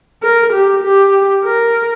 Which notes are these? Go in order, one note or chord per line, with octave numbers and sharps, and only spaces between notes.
A#4
G4
G4
A#4